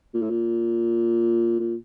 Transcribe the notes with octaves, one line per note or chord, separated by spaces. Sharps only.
A#2
A2
A#2
A#2